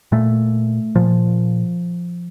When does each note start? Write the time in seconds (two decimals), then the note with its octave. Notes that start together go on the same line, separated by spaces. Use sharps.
0.12 A#2 A3
0.96 A#2 F3